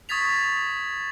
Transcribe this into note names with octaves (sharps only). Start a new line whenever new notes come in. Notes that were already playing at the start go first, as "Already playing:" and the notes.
C#6 D#6 G#6 A6 B6 F7